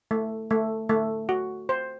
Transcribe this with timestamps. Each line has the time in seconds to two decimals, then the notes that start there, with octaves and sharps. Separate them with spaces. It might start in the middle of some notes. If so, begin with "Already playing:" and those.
0.11 A3
0.51 A3
0.89 A3
1.29 F#4
1.69 C5